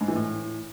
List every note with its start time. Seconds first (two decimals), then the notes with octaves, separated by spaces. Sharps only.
0.01 G#2
0.08 E3
0.16 A2